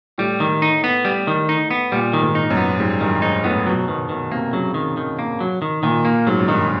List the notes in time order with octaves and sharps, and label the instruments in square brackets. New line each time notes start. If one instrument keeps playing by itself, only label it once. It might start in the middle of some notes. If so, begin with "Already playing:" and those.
[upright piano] A2 [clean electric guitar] G3
[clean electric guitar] D#3
D#4
B3
G3
D#3
D#4
B3
[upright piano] A#2 [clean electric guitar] G3
[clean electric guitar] D#3
[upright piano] G#2
[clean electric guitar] D#4
[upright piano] F#2
[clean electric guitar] B3
[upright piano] G#2 [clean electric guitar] G3
[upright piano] G2 [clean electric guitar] D#3
[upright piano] G#2 [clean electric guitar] D#4
[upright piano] A2 [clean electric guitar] B3
[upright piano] B2 [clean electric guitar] F#3
[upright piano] B2 [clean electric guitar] D#3
[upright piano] B2 [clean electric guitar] D#3
[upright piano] C3 [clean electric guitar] A#3
[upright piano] C#3 [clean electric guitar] F#3
[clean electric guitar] D#3
D#3
A#3
F#3
D#3
[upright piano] A#2 [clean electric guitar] D#3
[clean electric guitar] A#3
[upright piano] G#2 [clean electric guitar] F#3
[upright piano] F#2
[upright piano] G2 [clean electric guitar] D#3